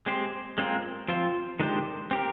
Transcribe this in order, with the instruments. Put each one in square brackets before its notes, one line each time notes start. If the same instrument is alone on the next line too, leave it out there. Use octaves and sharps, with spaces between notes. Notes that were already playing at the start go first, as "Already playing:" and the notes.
[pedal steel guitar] G#3 C4 G4 C5
G#3 C4 F4 A#4
F3 C4 F4 C5
D#3 G#3 D4 G4 C5
C4 G4 A#4